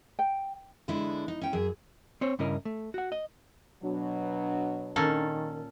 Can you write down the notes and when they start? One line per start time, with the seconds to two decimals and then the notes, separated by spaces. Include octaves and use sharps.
0.19 G5
0.88 D3 G#3 B3 D4 E4
1.28 D#4
1.42 C#4 G5
1.53 F#2 G#4 E5
2.21 C4 C5 C#5
2.39 G2 C#3 C#4 E4 A#4 D#5
2.65 A3
2.94 F#4 F#5
3.12 D#5
3.83 B2 F#3 D4
4.96 A#2 D#3 C#4 A4